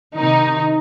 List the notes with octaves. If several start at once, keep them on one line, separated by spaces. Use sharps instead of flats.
C3 D#3 D#4